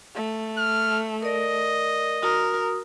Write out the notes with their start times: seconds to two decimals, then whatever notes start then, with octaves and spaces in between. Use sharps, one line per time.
0.16 A3
0.57 F6
1.23 A#4 D5 D#5
2.22 F#4 A#4 D#6